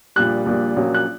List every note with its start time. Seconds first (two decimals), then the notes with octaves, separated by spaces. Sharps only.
0.16 A#1 A#2 G3 F#6
0.46 A#1 A#2 G3
0.76 A#1 A#2 F#3 A#3 C#4
0.94 F#6